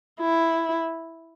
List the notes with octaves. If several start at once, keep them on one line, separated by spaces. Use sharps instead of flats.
E4